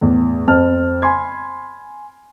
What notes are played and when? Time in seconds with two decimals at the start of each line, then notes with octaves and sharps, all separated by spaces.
0.01 E2 A2
0.48 F2 C4 A5 F6
1.02 G#5 B5 C6 G#6